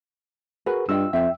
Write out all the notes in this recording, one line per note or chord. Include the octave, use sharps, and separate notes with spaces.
F#4 G#4 A#4 B4
G2 F4 D#5 G5 E6
F2 E5 G5